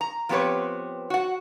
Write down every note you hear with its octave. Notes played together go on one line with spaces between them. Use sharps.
A#5
F3 B3 C4 G4 B4 C#5
F#4 F#5